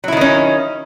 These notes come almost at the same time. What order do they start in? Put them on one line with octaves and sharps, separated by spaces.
F#3 E4 D#3 D#4 C#4